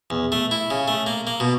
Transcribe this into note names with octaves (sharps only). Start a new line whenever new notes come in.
E2
A3
E4
C#3
A3
A#3
A#3
B2